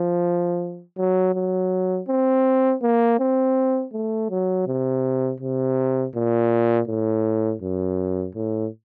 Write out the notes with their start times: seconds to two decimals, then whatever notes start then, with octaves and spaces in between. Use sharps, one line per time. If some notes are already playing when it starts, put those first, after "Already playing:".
Already playing: F3
0.98 F#3
1.35 F#3
2.09 C4
2.82 A#3
3.20 C4
3.93 A3
4.30 F#3
4.67 C3
5.40 C3
6.15 A#2
6.88 A2
7.62 F#2
8.35 A2